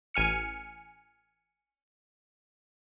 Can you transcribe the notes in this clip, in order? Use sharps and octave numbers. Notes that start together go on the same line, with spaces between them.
A1 G#5 F6 C#7